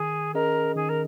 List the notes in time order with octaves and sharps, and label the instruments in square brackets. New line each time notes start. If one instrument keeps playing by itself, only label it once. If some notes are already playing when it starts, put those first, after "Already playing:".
Already playing: [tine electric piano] D#3 [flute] G#4
[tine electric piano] C#4 G#4 D#5 [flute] A#4
[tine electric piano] D#3 [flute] G#4
[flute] A#4